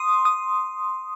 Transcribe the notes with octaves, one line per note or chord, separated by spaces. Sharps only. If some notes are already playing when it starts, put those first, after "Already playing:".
Already playing: C6 D#6
D#6